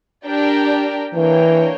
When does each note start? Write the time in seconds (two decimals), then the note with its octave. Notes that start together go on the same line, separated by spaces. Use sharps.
0.25 D4 G4 A#4 D5 G5
1.15 E3 A#3 D4 A#4 C#5 G5